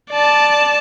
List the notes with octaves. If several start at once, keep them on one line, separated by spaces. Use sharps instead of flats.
D5 A5